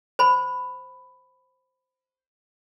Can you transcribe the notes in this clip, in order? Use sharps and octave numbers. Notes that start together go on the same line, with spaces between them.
C5 B5